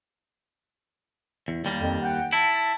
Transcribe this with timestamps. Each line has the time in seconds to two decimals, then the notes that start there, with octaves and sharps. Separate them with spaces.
1.48 E2
1.65 D#2 G3 A#3
1.79 F2
2.03 F#5 G5
2.33 E4 A5